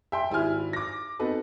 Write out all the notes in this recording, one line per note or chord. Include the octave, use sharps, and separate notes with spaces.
E5 G5 C6
G#1 E4 G4 G#5 F6
D6 A#6
B3 C4 D#4 F#4 A4 B4